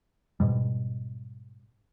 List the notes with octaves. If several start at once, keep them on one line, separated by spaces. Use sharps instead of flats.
G#2 B2 G3